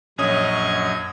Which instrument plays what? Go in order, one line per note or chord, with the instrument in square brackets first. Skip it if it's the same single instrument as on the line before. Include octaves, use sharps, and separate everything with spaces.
[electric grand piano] A#1 C#4 D#6 [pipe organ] F#2 D#5 G#6